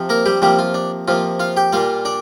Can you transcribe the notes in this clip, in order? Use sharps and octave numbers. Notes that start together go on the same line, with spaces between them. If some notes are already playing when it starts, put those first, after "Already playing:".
Already playing: C3 F3
A#3 A#4
G3 G4
C3 F3 G3 A#3 G4
F4
D4
C3 F3 A#3 F4
F4 F5
G4 G5
A#2 G3 A#3 F4 F5
D4 D5